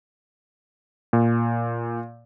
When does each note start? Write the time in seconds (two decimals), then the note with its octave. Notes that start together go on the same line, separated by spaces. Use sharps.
1.13 A#2